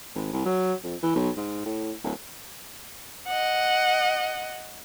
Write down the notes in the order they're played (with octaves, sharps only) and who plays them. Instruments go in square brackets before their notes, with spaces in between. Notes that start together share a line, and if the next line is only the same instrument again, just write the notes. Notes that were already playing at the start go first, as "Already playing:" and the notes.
[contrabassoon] G#1
C2
F#3
F2
E3
B1
G#2
A2
D1
[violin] D#5 F#5